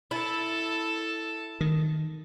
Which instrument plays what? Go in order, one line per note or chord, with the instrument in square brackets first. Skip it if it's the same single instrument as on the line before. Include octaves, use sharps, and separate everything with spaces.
[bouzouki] E4 [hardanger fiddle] A4 A5
[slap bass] D#3